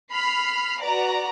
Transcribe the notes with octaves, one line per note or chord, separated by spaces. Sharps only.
B5 F6 C7
F#4 B4 D5 A#5